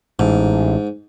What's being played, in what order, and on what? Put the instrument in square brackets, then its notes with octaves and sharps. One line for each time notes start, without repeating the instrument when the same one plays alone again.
[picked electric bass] A1 [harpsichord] G#2